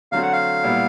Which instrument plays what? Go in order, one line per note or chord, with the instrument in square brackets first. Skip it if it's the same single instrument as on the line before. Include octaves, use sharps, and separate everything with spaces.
[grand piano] D3 F#3 A3 C4 [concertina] F5
[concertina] F#5
F5
[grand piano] A#2 G3 B3 E4